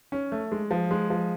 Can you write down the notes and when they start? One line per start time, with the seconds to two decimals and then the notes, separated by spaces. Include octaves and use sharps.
0.12 C#4
0.32 A3
0.52 G#3
0.71 F3
0.91 G#3
1.10 F3